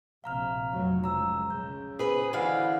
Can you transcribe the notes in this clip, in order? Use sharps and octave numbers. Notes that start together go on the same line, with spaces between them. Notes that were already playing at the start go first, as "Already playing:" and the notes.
A#1 C3 F5 A#5 F6
F1 F#3
C#2 F3 A#5 E6
C#3 G6
G#4 B4 C5
D3 E3 F5